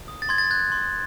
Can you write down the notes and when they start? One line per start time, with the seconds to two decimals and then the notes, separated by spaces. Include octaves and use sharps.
0.08 D#6
0.22 A6
0.29 C6 G#6
0.38 A6
0.51 F#6 G#6
0.72 C6